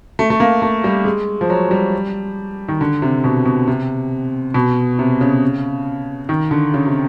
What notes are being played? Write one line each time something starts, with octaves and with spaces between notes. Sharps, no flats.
A3
A3
A#3
A3
G3
G#3
F3
F#3
G3
D#3
D3
C3
B2
B2
C3
B2
C3
C#3
D#3
D3
C#3
C3